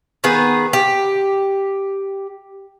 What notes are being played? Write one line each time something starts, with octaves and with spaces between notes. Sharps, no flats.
D#3 B3 G#4 B4
G4